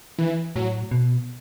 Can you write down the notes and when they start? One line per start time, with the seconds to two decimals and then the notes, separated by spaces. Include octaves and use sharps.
0.18 E3
0.56 A2 F#3
0.91 B2